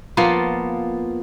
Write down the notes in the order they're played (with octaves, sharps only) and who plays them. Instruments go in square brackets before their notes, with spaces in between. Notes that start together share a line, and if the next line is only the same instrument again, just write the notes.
[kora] F3 A#3 B3 F4